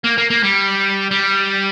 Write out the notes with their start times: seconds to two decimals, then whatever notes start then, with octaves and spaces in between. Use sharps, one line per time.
0.04 A#3
0.18 A#3
0.30 A#3
0.43 G3
1.11 G3